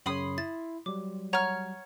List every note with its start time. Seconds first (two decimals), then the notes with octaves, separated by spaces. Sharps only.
0.06 F#2 C#3 C#5 B5 C6 D#6
0.38 E4 A6
0.86 F#3 G3 D6
1.33 C#5 F#5 A#5 F6